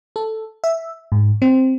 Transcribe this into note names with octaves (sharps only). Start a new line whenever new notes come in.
A4
E5
G#2
C4